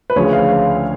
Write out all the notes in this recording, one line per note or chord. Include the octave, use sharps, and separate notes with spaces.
B4
D2 C#3 F3 C#5
F5
F5